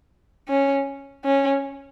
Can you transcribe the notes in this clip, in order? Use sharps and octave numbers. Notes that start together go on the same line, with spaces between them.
C#4
C#4